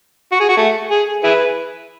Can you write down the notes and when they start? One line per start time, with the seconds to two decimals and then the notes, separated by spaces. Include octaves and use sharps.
0.32 F#4
0.41 G#4
0.48 F#4
0.57 A3
0.91 G#4
1.24 E4 G#4 B4